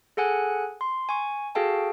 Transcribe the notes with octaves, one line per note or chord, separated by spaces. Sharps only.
G#4 A4 F#5 G#5 F#6
C6
G#5 C#6
F#4 G#4 A4 F5 G5 A5